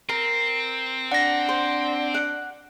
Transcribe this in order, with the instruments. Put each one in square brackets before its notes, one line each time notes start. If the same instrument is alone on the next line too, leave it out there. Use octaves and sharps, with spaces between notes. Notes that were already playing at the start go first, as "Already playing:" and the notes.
[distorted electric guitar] C4 [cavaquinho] A#4
[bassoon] D4 [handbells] F#5 A#6
[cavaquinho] C5
F#5